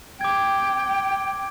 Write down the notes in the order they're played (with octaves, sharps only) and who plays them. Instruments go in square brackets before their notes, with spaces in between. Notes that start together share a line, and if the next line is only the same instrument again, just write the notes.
[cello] G5 [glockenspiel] D6 G#6